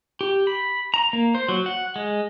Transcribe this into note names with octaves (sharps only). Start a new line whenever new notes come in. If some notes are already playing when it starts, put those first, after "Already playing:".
G4
B5
A#5
A#3
C5
F#3
F#5
G#3